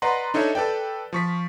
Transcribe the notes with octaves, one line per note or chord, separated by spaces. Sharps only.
B4 D5 D#5 F#5 A#5 C6
D4 D#4 A4 C#5 E5
A4 B4 D5 G5
F3 C#6 B6